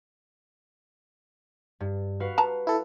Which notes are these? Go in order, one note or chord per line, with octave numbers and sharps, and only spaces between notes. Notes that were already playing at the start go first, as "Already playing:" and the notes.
G2
F#4 B4 F5
A5 A#5
E4 A4